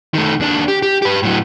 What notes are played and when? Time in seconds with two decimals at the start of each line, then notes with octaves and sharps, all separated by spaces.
0.14 D#3 A3
0.40 D#2 D4
0.68 G4
0.82 G4
1.02 G4 B4
1.23 A2 F#3